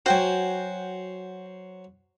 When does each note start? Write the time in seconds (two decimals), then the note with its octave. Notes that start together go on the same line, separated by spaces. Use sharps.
0.06 F#3 F#4 C5 G5 G#5